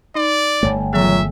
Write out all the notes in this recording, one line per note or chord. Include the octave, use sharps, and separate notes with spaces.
D#4 D5
G1 C#2 A3 C#5
A#2 D#3 E3 F#3 B3 G#4 E5